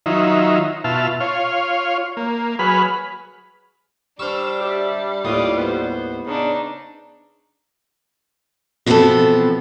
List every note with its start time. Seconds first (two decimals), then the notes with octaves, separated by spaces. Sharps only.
0.06 D#3 F#3 D#4 F4 E5
0.84 B2 F4 E5 A5 F6
1.20 F4 C#5 F5
2.17 A#3
2.59 F#3 G#4 B4 B5 F6
4.19 G3 D4 C5 C#6 E6 F6
4.61 G4 D5 E5
5.25 D#2 A2 F4 D5 D#6
5.57 B3 C5
6.26 C#3 D4 D#4
8.86 B2 E3 F3 B3 C4 A4